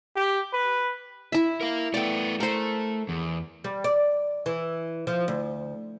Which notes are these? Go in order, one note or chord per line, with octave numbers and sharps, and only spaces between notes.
G4
B4
E4 E5
A#4 F5
A3 B3 D5 G5
A3 A#4 C5
E2
G3
D5
E3
F3
D2